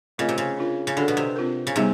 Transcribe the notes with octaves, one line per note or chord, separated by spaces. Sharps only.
C#3 A3 C4 F4 A#4 D#5
C3
C#3
D4 F4 A#4
C#3
D3 D4 F#4 A4
B2
C3
C4 F4 A#4
C#3
C3 G3 B3 D#4 G#4